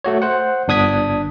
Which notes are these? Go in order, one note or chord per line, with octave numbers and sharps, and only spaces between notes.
A3 F#4 C#5
C5 F#5
G1 D4 D#6 G#6 B6